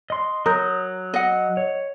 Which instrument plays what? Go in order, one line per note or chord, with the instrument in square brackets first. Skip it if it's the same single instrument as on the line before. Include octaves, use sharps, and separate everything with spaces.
[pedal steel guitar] D#5 C6
[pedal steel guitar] F#3 D#6 G6 [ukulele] A#4
[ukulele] D#5 F#5
[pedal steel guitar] C#5